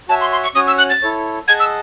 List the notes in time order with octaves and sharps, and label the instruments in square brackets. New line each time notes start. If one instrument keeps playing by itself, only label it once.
[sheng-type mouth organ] F#4 C#5 E5 G#5 [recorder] A5
[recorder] C6
C6
C#6
[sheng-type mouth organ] C#4 F#4 C#5 G#5 [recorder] D#6
[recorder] E6
F#6
A6
[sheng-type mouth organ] E4 A4 C#5
[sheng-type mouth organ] G#4 D#5 F#5 A5 [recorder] G#6
[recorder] E6